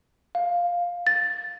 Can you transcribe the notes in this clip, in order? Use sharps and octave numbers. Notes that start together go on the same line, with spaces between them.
F5
A6